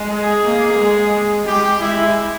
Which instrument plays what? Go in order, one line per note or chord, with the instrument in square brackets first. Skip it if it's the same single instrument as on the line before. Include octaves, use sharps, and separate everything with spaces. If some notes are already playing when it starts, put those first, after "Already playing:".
Already playing: [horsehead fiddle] G#3
[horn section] G#4
[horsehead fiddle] A#3
G#3
[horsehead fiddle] G#3 [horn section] G4
[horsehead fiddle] G#3 [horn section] E4